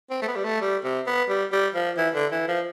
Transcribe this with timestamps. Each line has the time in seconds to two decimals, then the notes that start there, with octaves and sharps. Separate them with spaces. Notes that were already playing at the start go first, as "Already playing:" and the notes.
0.10 C4
0.22 A3
0.28 B3
0.36 G3
0.45 A3
0.61 G3
0.84 C3
1.07 B3
1.29 G3
1.52 G3
1.75 F3
1.97 E3
2.14 D3
2.32 E3
2.48 F3